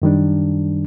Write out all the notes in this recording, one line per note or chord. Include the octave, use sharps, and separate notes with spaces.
F#2 D#3 G3 D4